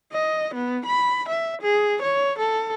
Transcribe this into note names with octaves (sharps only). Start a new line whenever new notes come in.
D#5
B3
B5
E5
G#4
C#5
A4